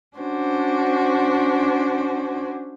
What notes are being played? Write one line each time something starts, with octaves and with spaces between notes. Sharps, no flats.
C#4 D4 F#4 C5